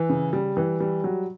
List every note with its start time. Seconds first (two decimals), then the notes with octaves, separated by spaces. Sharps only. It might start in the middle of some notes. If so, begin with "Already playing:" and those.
Already playing: E3
0.09 C#3
0.33 G3
0.57 E3
0.80 G3
1.04 F#3